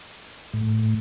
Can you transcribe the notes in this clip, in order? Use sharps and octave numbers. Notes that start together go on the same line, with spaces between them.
A2